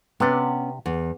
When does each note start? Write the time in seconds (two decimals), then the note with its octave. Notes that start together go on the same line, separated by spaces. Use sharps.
0.20 C3 B3 C#4 D4
0.86 E2